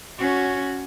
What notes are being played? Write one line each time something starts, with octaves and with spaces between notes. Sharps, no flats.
C#4 F#4